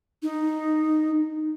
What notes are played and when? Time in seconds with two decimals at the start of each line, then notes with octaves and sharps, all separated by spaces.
0.23 D#4